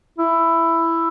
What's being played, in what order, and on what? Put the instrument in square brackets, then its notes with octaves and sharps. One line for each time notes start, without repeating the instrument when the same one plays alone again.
[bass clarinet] E4